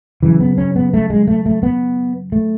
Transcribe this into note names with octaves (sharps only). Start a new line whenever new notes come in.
F#2 C#3 E3
B3
C#4
B3
A3
G#3
A3
A3
B3
A3